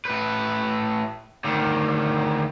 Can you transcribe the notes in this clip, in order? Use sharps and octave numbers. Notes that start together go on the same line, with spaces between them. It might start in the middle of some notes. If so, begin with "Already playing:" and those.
A2 B4
D2 D#3